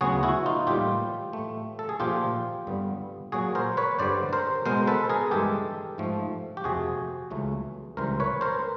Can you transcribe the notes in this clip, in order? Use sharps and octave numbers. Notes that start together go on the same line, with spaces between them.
D2 C#3 F#3 B3 F#4 G#4
E4 F#4
D#4 F4
A2 E3 G3 A#3 F4 G4
A2 E3 A3
A4
G#4
A#2 F3 A3 F4 G4
G2 D3 G3 B3
A#2 F#3 A#3 F#4 G#4
A#4 C5
B4 C#5
G2 D3 G3 C5 D5
A#4 C5
B2 G#3 B3 A#4 C5
A4 B4
G#4 A#4
G2 E3 G#3 G4 A4
G#2 F3 A3
G4
F2 C3 F3 F#4 G#4
C#2 C#3 E3 A3
C#2 C3 E3 G3 A#4 C5
B4 C#5
A#4 C5